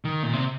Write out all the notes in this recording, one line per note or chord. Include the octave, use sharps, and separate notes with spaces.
D#3
A#2
C3